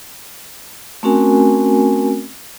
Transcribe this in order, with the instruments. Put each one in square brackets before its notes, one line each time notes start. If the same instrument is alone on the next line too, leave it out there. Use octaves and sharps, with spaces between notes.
[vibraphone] A3 C4 C#4 F#4 A#4 G#5